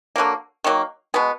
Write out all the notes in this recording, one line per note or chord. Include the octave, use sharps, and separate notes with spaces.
D3 F#3 A#3
D#3 F#3 A#3
B2 G#3 B3